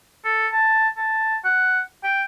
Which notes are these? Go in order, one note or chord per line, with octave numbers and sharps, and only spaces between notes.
A4
A5
A5
F#5
G5